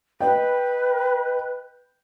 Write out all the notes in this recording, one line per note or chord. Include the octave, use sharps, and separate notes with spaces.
B4 D#5 G5